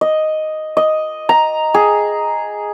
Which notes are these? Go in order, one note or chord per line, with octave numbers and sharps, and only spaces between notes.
D#5
D#5
A#5
G#4